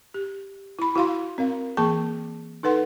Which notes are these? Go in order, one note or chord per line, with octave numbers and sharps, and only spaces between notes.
G4
E4 B5
E4 F#4 F5 C6
C4 A#4 F5
E3 A#3 G#4 A5 C#6
D#4 A4 B4 F#5 C6